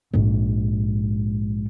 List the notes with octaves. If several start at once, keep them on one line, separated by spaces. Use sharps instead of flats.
A#1 G#2